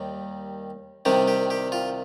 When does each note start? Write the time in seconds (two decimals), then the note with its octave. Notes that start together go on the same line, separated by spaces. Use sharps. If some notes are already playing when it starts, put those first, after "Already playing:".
Already playing: D#2 D#3 G3
1.05 C2 C3 D#3 G3 G4
1.28 G4
1.50 G4
1.72 F4